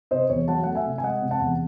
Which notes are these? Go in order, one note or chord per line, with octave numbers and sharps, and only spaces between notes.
C3 C5 D#5
E2 C#5
F#3 F#5 A5
A3 F#5
E5 G#5
C3
G#5
G#3 D#5 F#5
C3
F#5 A5
E2